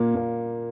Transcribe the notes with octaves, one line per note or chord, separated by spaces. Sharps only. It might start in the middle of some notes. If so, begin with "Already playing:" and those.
Already playing: A#2 A#3
A#2 A#3